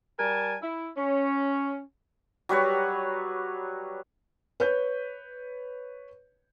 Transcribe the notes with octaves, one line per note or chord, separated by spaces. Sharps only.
G3 A#4 G#5 A5
E4
C#4
F#3 G3 B4 C#5
B4 C#5 G6